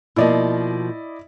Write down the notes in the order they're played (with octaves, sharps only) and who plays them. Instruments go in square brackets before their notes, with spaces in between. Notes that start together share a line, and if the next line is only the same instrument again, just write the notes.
[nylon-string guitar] B2 F3 A#3 [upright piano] E4 D5 D#5